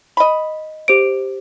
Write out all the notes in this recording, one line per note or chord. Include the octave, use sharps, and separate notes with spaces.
D#5 B5
G4 C5 D7